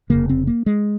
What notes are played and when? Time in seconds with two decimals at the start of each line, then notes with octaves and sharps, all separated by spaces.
0.10 D#2 C#3 A#3
0.14 F1
0.29 C4
0.47 A#3
0.66 G#3